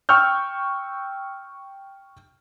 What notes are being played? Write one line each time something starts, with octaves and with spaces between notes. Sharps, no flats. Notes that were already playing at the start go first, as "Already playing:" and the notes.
G5 C#6 E6 F6 G6